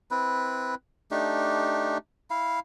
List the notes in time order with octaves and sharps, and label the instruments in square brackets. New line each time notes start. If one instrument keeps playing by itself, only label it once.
[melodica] C4 E4 B4
A3 D4 D#4 G4
E4 F5